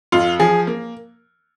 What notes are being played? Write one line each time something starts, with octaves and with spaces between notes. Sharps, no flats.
F2 F4
F3 G#4
A#3